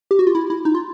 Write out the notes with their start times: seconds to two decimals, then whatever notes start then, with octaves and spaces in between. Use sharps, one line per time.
0.11 G4
0.19 F#4
0.27 F4
0.35 E4
0.50 E4
0.65 D#4
0.75 F4